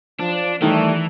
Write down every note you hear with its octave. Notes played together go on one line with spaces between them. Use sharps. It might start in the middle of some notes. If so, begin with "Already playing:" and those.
F3 D4
D#3 E3 G3 A3